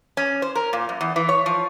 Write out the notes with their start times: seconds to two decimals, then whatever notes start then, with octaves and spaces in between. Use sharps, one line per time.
0.17 C#4
0.42 C5
0.55 A#4
0.73 A#2
0.89 F#2
1.01 E2
1.16 E3
1.29 C#5
1.46 F3